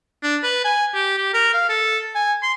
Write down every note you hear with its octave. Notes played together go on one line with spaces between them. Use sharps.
D4
B4
G#5
G4
G4
A#4
F5
A4
G#5
C6